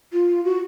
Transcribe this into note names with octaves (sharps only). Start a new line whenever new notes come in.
F4
F#4